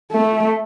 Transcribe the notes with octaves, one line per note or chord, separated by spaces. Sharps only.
A3